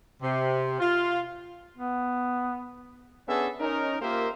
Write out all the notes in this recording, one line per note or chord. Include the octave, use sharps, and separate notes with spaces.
C3
F4
B3
B3 C#4 D4 G#4 A4 E5
C#4 D#4 A#4
A#3 F4 G4 A#4 C5 E5